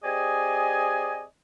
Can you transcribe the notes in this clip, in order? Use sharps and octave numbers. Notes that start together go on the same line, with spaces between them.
C4 G4 G#4 D5 D#5 G#5